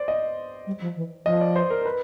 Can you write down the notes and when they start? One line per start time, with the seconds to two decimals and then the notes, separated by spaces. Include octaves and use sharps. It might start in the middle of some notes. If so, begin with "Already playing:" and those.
Already playing: C5 D5
0.08 D#5
0.67 G3
0.81 F3
0.96 E3
1.26 F3 D#5
1.41 D5
1.56 C5
1.70 A#4
1.82 A#4
1.86 B4